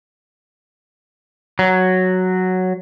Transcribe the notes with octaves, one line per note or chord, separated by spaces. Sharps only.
F#3